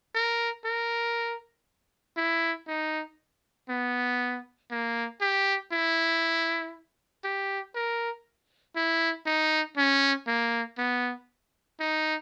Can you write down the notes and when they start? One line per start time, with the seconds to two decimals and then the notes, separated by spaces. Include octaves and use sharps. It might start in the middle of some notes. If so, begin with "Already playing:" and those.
0.15 A#4
0.65 A#4
2.17 E4
2.67 D#4
3.69 B3
4.71 A#3
5.21 G4
5.72 E4
7.24 G4
7.75 A#4
8.76 E4
9.26 D#4
9.77 C#4
10.27 A#3
10.78 B3
11.80 D#4